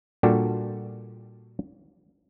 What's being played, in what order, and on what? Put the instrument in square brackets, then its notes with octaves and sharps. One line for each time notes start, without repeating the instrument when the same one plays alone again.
[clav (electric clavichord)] A#2 G3 D4 F#4 G4 A4